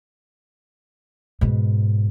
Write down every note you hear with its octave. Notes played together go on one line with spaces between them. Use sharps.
G#2 B2